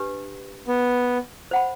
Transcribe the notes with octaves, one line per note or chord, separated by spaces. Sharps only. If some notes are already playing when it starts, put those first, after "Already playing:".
Already playing: D4 G4 B4
B3
C5 F#5 B5